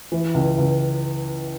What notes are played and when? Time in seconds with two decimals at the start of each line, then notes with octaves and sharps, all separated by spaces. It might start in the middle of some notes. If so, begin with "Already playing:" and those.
0.12 E3
0.34 C#2
0.58 C#2